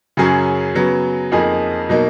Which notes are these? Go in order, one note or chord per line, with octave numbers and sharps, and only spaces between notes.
F#2 C#3 F#3 C#4 G#4
C#3 F#3 B3
F2 F3 A#3 D#4 G#4
B2 F#3 A#3 D#4